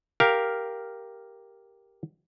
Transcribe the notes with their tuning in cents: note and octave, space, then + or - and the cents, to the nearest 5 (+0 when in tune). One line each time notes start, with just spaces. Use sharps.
G4 +0 A#4 +0 F5 +0